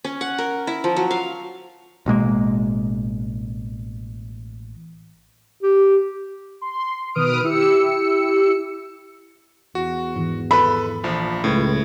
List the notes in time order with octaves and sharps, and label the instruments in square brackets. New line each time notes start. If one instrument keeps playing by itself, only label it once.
[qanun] C#4
F#5
A#4
E4
F3
F#3
F5
[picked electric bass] A1 B2 G#3 A#3
[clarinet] G4
[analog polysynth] C6
B2 D#3 B4 D#6 F6 D7
E4 G4 E6 C#7
[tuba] E2 [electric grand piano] F#4
[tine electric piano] G#2 D#3 E3
[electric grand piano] A4 B4 [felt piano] B5
[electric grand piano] A#1 F3
[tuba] C#2 [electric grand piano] A2 [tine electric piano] C#4 B4